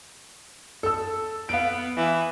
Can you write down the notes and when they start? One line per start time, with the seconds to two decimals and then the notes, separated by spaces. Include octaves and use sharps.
0.83 A4 E6
1.49 B3 F5 D7
1.97 E3